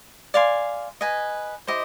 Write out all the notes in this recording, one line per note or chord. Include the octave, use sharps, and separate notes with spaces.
D5 F5 G#5 C6
B4 D#5 G#5
E4 G4 C5 D#5